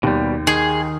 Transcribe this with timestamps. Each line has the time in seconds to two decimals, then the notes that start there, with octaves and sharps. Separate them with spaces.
0.03 D#2 B2 G3
0.47 D#3 G#4